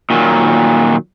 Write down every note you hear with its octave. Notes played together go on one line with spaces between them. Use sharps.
A#2 D#3 F#3